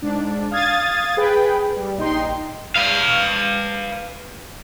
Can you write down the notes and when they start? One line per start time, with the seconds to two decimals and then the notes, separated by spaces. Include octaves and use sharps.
0.02 G#2 D4
0.51 F5 D#6 G#6 A6
1.17 G#4 B4 G5
1.76 G3
1.97 A#1 D#4 G5 C6
2.76 B4 F5